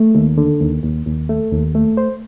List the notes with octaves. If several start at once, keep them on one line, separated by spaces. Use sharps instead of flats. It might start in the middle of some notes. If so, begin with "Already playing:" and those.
Already playing: A3
D#2
D3
D#2
D#2
D#2
A3
D#2
A3
C5